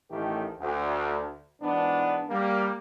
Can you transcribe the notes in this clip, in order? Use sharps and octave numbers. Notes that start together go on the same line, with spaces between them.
A1 A2 D#3 A3 G4
D2
G#2 E3 B3 D4
G3 A#3